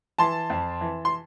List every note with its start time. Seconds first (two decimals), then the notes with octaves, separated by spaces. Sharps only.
0.18 E3 A5 C6
0.50 F2
0.81 E3
1.05 C6